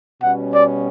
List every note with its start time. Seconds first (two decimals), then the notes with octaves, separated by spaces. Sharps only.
0.22 B2 G3 C#4 F#5
0.54 D5